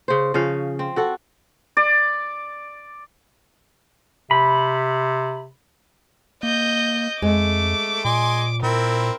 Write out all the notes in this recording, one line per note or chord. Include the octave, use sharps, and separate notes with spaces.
C#3 C5
C#3 F3 C#4 F5
C4
F#4 A4 F#5
D5
C3 B5
A#3 D#5 G6
F2 G#3 A3 D6
A#2 D#5 G#5 C6
A#2 C4 E4 A#4